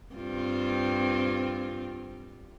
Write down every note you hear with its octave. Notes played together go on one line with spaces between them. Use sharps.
G2 C4 F4